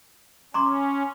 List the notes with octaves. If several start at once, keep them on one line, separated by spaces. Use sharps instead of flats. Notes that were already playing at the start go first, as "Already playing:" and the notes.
C#4 A#5 C6 D6